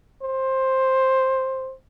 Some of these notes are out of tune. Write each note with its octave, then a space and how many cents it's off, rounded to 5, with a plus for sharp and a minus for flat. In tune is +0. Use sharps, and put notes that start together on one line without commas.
C5 +10